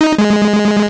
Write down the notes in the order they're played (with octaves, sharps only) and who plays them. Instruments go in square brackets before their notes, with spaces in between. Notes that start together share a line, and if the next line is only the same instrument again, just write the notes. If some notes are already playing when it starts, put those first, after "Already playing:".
[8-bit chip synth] D#4
G#3